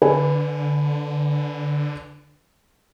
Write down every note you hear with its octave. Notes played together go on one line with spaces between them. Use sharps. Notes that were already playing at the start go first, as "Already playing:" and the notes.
D3 B4 G#5